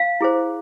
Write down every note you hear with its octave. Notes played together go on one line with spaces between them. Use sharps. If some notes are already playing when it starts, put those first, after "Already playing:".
Already playing: F5
E4 G#4 C5